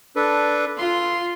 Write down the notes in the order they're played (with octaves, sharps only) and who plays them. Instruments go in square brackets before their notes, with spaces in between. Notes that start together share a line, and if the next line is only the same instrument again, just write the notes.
[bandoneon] D4 A4 B4
[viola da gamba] F4 [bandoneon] C6